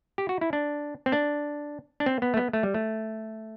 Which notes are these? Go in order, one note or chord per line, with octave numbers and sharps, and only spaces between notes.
G4
F#4
E4
D4
C4
D4
D4
C4
B3
A3
B3
A3
G3
A3